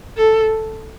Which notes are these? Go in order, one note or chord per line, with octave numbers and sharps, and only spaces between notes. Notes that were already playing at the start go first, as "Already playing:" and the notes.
A4